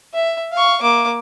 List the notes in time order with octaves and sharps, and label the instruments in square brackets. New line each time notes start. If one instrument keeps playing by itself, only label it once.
[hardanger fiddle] E5
F5 C#6
A#3 D6